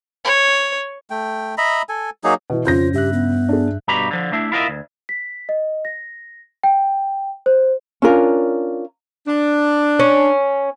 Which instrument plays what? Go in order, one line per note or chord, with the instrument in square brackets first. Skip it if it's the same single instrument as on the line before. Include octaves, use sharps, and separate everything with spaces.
[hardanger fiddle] C#5
[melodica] A3 G5
D#5 E5 A#5 B5
A4 G#5
F#3 A#3 D#4 G#4
[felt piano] B2 E3
[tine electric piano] F2 C5 [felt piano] C#3 G6 A#6 [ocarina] F4
[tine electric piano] G2 E5 F#6 [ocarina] G4
[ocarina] B3
[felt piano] D4 G#4
[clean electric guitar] G2 B2 G4 A#5 B5
D3 F3
A3 D4 E4
E4 F4 A#4 D#5 E5
D2
[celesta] B6
D#5
A#6
G5
C5
[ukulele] C#4 D4 F4 A#4
[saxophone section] D4
[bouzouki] C#4